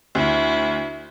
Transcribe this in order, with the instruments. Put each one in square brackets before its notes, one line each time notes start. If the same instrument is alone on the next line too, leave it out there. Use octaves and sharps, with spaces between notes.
[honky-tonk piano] D2 [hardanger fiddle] E4